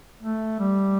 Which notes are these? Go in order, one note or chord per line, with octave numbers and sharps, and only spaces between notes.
A3
G3